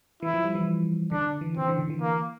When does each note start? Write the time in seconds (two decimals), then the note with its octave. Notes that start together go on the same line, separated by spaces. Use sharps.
0.23 E3 E4
0.34 F3
0.45 G3
0.55 E3
1.12 D3 D4
1.27 D3
1.41 E3
1.57 E3 C4
1.68 D3
1.79 D3
1.90 E3
2.01 A#3